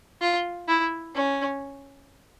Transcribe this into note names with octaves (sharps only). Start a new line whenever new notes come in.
F4
E4
C#4